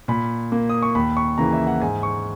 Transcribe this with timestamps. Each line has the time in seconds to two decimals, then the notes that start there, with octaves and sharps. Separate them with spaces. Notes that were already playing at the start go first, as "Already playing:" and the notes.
0.08 A#2 B5
0.52 A#3
0.70 D#6
0.82 C#6
0.95 D#2 B5
1.17 C#6
1.38 C#3 E3 A#3 A#5
1.53 E5
1.67 F#5
1.82 G#2 G#5
2.03 C#6